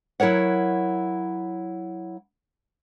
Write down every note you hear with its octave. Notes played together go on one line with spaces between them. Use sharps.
F#3 E4 A#4 C#5 F#5